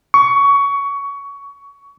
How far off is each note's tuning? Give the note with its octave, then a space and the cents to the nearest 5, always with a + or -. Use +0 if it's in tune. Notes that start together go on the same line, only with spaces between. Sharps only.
C#6 +20